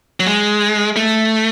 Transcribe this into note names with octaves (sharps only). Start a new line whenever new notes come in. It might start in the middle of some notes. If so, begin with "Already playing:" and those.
F#3
G#3
A3